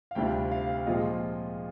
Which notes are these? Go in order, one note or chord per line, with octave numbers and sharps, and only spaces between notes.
F5
D2 C3 G3 D4 F4 G5
F5
A#2 F3 G#3 C4 F4 D#5